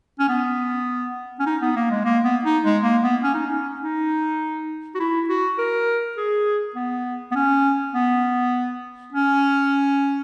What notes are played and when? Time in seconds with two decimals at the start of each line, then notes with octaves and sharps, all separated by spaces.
0.19 C#4
0.29 B3
1.40 C#4
1.46 D#4
1.62 B3
1.76 A#3
1.91 G#3
2.05 A#3
2.24 B3
2.45 D#4
2.64 G#3
2.83 A#3
3.04 B3
3.23 C#4
3.34 D#4
3.47 C#4
3.81 D#4
4.95 F#4
5.00 E4
5.29 F#4
5.58 A#4
6.17 G#4
6.76 B3
7.32 B3
7.36 C#4
7.94 B3
9.13 C#4